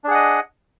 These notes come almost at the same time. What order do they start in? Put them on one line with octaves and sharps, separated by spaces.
D4 G#4 F#5 D#5